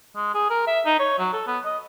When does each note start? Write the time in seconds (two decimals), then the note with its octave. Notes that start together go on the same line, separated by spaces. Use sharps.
0.16 G#3
0.34 G#4
0.50 A#4
0.67 E5
0.86 D#4
0.99 C#5
1.19 F#3
1.33 A4
1.47 B3
1.65 D#5